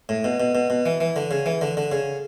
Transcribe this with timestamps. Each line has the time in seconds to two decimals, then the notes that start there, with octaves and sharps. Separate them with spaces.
0.09 A2
0.24 B2
0.40 B2
0.55 B2
0.70 B2
0.86 E3
1.00 E3
1.16 D3
1.31 C#3
1.46 E3
1.61 D3
1.77 D3
1.92 C#3